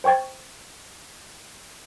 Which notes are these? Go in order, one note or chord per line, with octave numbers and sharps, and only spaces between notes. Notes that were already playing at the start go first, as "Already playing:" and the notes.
C5 G5 C#6 G#6 A6